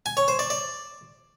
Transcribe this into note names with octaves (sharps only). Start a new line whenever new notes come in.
G#5
C#5
C5
D5
D5